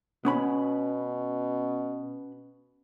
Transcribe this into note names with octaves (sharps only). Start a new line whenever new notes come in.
B2 B3 C#4 B5